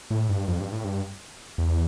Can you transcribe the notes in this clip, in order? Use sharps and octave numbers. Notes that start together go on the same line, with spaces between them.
A2
G2
F2
G2
A2
G2
E2